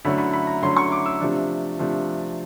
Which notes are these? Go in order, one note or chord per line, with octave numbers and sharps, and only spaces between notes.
D3 F#3 A3 C#4 E4 B5
B5
B5
A#5
D3 F#3 A3 C#4 E4 C6
C#6
D6
E6
C3 F3 A3 D4
C3 F3 A3 D4